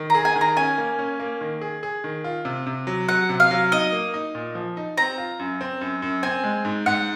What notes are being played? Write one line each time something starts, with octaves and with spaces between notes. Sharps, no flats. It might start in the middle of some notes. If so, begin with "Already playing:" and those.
Already playing: D#3
G#4 A#5
G#5
D#3
A#5
C#4 G#5
A#3
C#4
A#3
D#3
G#4
G#4
D#3
F4
C3
C3
F#3
F#3 F#5
C3
F5
F#3
D#4 D#5
A#3
D#4
A#2
F3
D#4
C4 A#5
F4
F#2
C4
F#2
F#2
C4 G#5
G#3
G#2
G#2 F#5